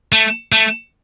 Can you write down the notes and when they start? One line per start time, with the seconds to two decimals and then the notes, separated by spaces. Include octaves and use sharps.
0.12 A3
0.52 A3